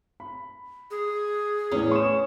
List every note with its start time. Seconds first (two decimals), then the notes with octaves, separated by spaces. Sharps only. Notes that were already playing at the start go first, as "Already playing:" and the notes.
0.20 B5
0.91 G#4
1.72 E2 A2 C#4 C#5
1.91 C#6 E7